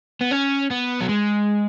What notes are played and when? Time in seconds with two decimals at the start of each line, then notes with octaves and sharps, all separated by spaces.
0.21 B3
0.31 C#4
0.71 B3
1.00 F#3
1.09 G#3